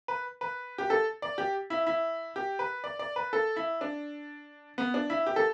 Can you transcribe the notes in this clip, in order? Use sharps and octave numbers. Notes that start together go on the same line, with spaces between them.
B4
B4
G4
A4
D5
G4
E4
E4
G4
B4
D5
D5
B4
A4
E4
D4
B3
D4
E4
G4
A4